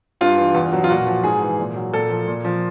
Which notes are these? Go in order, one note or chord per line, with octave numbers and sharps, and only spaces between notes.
G2 F4
E3
E2
B2 F#3
F4
A#2 F#4
F3
G#2 G#4
E3
A#2
F#3
A#2 A4
F3
A#2
F3